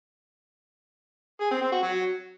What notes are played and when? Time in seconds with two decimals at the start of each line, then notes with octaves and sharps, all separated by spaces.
1.41 G#4
1.51 C4
1.62 C4
1.72 F#4
1.82 F#3